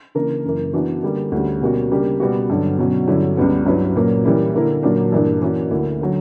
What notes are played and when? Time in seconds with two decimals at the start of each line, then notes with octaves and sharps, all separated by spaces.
0.15 C#3 E3 A#3 D4 A#4
0.45 F#2 C#3 E3 A#3
0.73 E3 B3 D4 F#4
1.03 D3 G3 A#3
1.32 D2 D3 G3 C#4 G4
1.61 B2 G3 A#3 C#4 F#4
1.91 C#3 G3 A#3 D4 G4
2.20 B2 G3 B3 F#4
2.50 G2 D3 F#3
2.78 B2 F#3 C#4
3.08 G2 D3 F#3 C#4 E4
3.37 C#2 C#3 G3 B3
3.66 G2 F#3 C#4 E4 B4
3.96 A#2 F#3 A#3
4.24 E3 G3 A#3 C#4 E4
4.54 D3 A#3 E4 A#4
4.83 A#2 F#3 A#3 D4
5.12 G2 E3 A#3 D4
5.42 E3 A#3 C#4 F#4
5.71 D2 D3 A#3 E4
6.01 D3 F#3